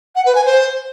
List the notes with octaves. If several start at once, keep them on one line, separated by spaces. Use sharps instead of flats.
F#5
B4
G#5
C5